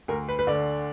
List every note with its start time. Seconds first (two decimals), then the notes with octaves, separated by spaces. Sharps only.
0.08 D2 A#4
0.29 B4
0.39 B4
0.47 D3 D5